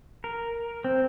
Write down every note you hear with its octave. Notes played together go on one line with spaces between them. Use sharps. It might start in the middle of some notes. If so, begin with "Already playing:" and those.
A#4
C4